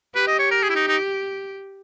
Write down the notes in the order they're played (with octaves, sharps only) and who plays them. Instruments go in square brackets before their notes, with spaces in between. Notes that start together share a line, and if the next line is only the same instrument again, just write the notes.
[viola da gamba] G4 [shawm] B4
[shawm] D#5
C#5
A#4
G#4
E4
D#4
D#4